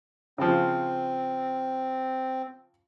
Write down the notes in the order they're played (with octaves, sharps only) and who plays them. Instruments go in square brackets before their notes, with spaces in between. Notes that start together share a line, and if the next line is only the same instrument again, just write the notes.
[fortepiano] C#3 F3 [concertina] C4